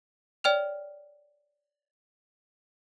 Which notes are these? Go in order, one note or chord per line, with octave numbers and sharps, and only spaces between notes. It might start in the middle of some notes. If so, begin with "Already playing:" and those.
C#5 D5 G5 F6 F7